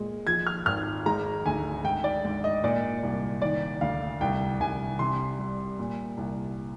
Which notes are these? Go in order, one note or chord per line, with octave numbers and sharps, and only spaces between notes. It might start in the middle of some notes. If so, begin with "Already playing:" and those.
Already playing: A#2 G#3
F3 G#6
F6
G#1 F6
G#3 A#5
D2 G#5
G#2 G5
D5
G#2
D#5
A#2 D5
C2
D#3 D5
D2 F5
C2 G5
C2 G#5
C3 C6
G3
A#2
C2